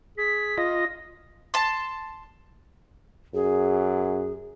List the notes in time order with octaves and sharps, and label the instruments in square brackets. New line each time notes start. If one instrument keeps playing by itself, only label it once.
[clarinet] G#4 [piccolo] B6
[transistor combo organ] F4 D#5 [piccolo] A#6
[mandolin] A5 C6
[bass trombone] F#2 [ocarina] G#4